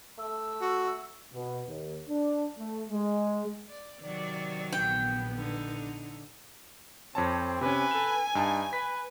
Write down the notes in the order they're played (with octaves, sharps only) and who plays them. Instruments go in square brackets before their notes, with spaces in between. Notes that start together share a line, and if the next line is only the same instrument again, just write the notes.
[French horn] A3 [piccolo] E6
[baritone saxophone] F#4
[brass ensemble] B2
D#2
D4
A3
G#3
[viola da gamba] D5
[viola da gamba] C3 D#3 F#3 [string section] D5
[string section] A#1 B3 [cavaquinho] G5
[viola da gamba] D3 D#4
[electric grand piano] F2 C#5 A5 [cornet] C4
[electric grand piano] C3 C#4 [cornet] B4 [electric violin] G#5
[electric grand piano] A4 E7
[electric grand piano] G2 A5 [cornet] D#4
[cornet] B4 [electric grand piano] B6